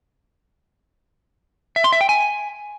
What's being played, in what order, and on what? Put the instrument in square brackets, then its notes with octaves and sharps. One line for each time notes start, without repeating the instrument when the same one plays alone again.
[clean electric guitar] E5
C6
E5
G5
G#5